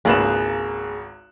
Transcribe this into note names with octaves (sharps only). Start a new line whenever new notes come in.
G#1 C#2 A#3 G#4 B4 F#6 E7